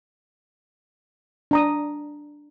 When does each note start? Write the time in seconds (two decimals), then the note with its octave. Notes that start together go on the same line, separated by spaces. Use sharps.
1.51 D4 A#5 D#6